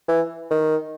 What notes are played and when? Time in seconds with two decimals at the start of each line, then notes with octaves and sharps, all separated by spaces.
0.09 E3
0.51 D#3